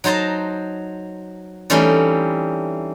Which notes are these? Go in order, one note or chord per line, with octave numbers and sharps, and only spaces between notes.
F#3 D#4 C5 A5 A#5
E3 G3 A3 C4 C#4 D#4